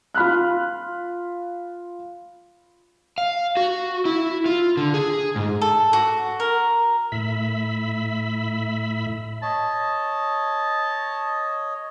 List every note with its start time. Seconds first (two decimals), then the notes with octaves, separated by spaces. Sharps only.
0.14 F4 B5 F6 F#6
3.18 F5
3.57 F#4
4.05 E4
4.46 F4
4.77 D3
4.94 G#4
5.36 G#2
5.62 A4
5.93 F#4
6.40 A#4
7.12 A2 E5 B5
9.42 C#5 D#5 A5